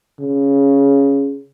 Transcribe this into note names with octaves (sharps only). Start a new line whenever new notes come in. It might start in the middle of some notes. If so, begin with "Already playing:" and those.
C#3